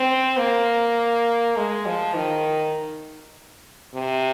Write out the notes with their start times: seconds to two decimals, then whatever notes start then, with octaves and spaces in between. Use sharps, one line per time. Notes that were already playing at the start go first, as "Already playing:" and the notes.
Already playing: C4
0.38 A#3
1.56 G#3
1.86 F3
2.15 D#3
3.93 C3